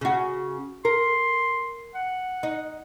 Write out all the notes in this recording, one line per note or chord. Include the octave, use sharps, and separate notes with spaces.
C#3 F#4
A#4 C6
F#5
D#4